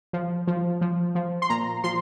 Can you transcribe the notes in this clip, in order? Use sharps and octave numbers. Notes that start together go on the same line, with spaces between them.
F3
F3
F3
F3
C6
A#2 A#5
F3 C6